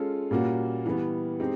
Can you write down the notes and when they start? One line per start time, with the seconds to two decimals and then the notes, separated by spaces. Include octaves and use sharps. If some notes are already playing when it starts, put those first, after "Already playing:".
Already playing: G#3 C#4 F4 A4
0.31 A#2 G3 A#3 C#4 F#4
0.85 E3 G3 B3
1.40 G#3 C4 D#4 G4